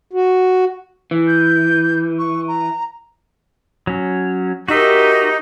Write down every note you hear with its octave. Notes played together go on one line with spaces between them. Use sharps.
F#4
E3
G6
C#6
A#5
F#3 C#4
D#4 F#4 G4 A#4 E5